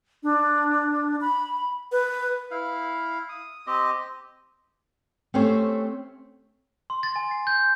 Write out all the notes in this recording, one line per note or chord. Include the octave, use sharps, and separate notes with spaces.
D4
B5
B4
E4 F5
D#6
C4 G4 D#5
A3 C4 C#4 G4 C5 C#5
C6
A6
G#5
C7
G6